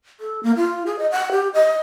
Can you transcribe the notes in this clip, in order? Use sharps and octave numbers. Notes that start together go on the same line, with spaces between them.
A4
A#3
F4
G#4
D#5
F#5
G4
D#5